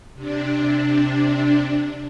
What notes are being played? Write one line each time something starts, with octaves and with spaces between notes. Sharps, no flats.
C3 D4